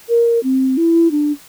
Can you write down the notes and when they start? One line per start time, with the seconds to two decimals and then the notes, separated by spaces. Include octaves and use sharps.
0.09 A#4
0.43 C4
0.77 E4
1.11 D4